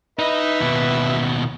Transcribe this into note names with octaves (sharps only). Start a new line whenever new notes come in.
D#4 B4 D#5 E5
D#2 B2